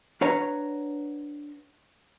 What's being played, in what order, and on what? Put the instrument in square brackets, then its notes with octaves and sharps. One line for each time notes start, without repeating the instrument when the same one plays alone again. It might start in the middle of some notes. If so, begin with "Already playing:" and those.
[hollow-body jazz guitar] D4 B4 C#5 F#5 A#5